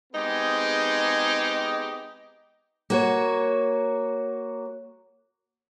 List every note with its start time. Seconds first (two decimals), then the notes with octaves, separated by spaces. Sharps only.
0.13 G#3 B3 C4 D#4 G4 G#4
2.90 A#3 F#4 C#5